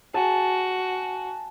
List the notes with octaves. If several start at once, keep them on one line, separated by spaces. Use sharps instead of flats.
F#4 G#5 A5